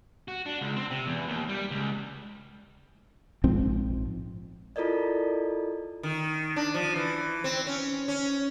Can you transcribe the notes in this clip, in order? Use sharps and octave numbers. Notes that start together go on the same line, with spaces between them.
F#4
D4
C#2
C4
C3
E2
D#2
G3
C#2
A#1 G#2 F3 C4
E4 F4 A4 A#4 D5 D#5
D#3
D4
F3
E3
C4
C#4
C#4